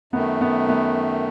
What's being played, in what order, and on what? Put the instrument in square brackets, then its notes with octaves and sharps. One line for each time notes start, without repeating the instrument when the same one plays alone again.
[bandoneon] F#2 D#3 A3 [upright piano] B3
[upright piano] B3
B3